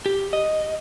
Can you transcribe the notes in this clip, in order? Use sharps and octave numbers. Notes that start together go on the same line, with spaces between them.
G4
D#5